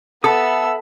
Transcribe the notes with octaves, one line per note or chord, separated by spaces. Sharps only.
B3 A4 E5 B5 D#6 E6